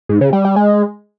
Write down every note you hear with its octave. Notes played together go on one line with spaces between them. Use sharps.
G#2
C#3
G3
G3
G#3